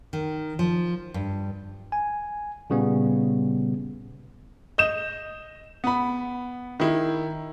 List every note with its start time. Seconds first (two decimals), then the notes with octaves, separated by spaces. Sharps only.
0.13 D#3
0.59 F3
1.14 G2
1.92 G#5
2.70 A#2 C#3 G3 B3
4.78 D#5 G6 E7
5.84 B3 B5
6.80 D#3 E4